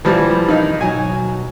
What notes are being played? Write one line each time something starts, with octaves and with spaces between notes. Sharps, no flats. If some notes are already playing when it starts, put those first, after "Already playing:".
E3 F3 G3
D#3 D#4
B2 F#3 G#5